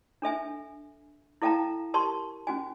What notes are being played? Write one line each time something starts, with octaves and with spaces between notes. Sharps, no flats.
D4 A4 E5 G#5
E4 A4 F5 G5 A5 A#5
G4 A#4 A5 C6 C#6
C#4 F#4 G#5